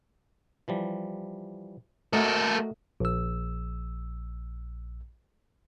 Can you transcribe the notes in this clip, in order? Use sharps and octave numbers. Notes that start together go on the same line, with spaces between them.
E3 F3 G3
A3 A#3 F#4 A4 A#4 D#5
A#1 E6